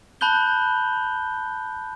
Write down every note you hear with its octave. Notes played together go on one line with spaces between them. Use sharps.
A5 B5 F#6 G6 G7